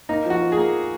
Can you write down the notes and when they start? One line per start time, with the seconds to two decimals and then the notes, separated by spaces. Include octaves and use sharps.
0.09 A#3 D#4
0.25 F3 F#4
0.41 F3
0.52 G#4
0.57 A#3